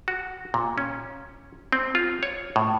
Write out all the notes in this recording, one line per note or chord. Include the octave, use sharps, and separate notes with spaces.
F#4
A#2
C#4
C4
F4
C#5
A2